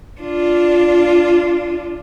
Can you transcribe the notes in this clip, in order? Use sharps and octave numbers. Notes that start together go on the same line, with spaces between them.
D4 F4